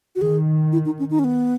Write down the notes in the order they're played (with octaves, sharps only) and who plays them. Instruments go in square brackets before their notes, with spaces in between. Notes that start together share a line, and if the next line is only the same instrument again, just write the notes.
[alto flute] F#4
[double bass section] D#3 [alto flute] G#4
[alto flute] E4
D#4
C#4
D#4
C#4
B3